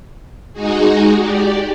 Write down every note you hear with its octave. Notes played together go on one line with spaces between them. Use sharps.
G#3 D#4 F#4 G#4
G4 D5